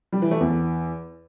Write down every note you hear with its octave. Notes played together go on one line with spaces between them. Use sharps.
G3
E3
A3
E2